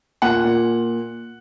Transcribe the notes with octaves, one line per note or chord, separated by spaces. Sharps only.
A#2 F#5
A#2